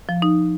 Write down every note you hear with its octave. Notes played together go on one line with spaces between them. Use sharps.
F3
D#4